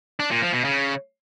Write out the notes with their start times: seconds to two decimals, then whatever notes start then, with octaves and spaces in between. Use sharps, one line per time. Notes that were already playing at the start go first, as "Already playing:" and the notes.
0.20 D4
0.31 A#2
0.42 F3
0.53 B2
0.64 C#3